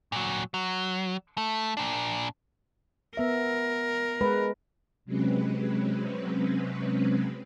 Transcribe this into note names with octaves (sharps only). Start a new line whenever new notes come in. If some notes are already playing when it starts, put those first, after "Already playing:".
A#2 F#3
F#3
A3
A#2 D4
B3 A#4 E5
G#3 B4
C3 F#3 G#3 C4 C#4 B4